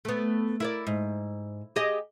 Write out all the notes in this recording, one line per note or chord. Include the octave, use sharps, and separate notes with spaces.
A3 B3
E4 A#4 D5
G#2
G4 G#4 D#5